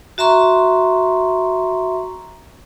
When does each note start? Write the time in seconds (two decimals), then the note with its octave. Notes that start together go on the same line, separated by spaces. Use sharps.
0.18 F#4 E5 A#5 C6 C#6